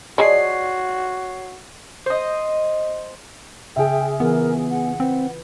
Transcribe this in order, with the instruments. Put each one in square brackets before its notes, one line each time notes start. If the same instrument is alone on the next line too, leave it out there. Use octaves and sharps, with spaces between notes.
[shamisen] F3 G#3 G#4 [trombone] F#4 [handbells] C#5 C7 [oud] D5
[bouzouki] C5 D#5
[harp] C#3 F6 [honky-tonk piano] G#4 E5 [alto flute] G5
[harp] E3 F4 [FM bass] B3 [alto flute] A#4
[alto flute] F#5
[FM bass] C4 [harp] B4